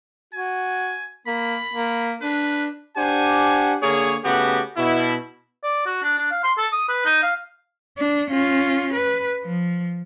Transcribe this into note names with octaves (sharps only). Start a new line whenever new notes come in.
F#4 G#5
A#3 B5
A#3
D4 B4
D4 G4 C5 F#5 G#5
D3 A#3 G#4 C#5
C#3 A3 B3 F#4 G4
B2 E4
D5
F#4
D4
D4
F5
C6
A4
D#6
B4
D#4
F5
D4
C#4 F4
B4
F3